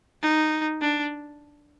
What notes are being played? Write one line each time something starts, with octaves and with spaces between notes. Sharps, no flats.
D#4
D4